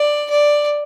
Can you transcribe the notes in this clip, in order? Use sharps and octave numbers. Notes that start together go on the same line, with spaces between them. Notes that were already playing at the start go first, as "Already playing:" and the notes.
Already playing: D5
D5